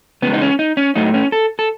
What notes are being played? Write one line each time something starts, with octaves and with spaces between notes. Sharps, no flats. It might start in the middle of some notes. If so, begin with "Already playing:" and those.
C#3 E3 G#3 B3
D#4
C#4
D#4
C#4
A2 F#3 A3 D#4
C#4
A4
A4